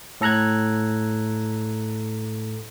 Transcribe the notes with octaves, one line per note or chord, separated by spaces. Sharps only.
A2 A4 A#5 F#6 G#6